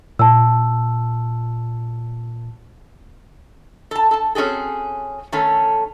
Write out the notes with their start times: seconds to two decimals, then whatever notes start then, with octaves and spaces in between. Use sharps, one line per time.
0.19 A#2 A5 E6
3.91 A4 A5
4.11 A4 A5
4.35 C4 C#4 F#4 G#4 A4
5.32 D#3 A3 C#4 A4